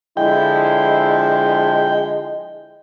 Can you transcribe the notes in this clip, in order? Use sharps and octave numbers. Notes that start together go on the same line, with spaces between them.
D3 F3 G#3 E4 G5